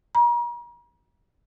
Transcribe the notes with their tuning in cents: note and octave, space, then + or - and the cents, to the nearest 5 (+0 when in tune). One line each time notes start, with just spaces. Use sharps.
A#5 +40